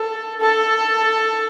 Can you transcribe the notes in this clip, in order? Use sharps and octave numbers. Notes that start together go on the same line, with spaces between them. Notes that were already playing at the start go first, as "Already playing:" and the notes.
Already playing: A4
A4